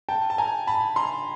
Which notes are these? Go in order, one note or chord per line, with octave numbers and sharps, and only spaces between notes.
G5 A5
A5
G#5 A#5
A5 B5
A#5 C6